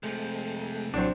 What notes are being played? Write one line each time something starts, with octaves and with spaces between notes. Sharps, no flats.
C3 F3 G#3 A3
A1 F#3 C4 D4 C#6